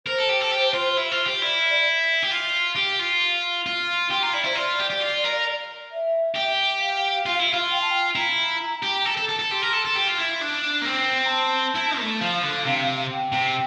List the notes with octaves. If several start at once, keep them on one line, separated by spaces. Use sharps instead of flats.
A#4 C5
A4
G4
A4
G4
F4
E4
F4
G4
E4 D5
G4
F4
G4
F4
F5
F4
G4 C6
F4 A#5
E4 D5
E4 C5
F4 D5
G4
G4
F4
A#4
E5
G4
F5
F4
E4
F4
G5
A5
G5
E4 A#5
G4
A4
A4
A4
A4
G4 C6
A#4
A4
A4
G4
F4
E4
D4
A#3
C4
A#5
A5
E4
A3
F3 F5
D3
C3
G5
C3